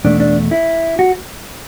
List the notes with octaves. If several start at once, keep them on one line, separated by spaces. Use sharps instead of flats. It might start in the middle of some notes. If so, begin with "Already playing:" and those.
E2 B2 A3 D4
D4
E4
F#4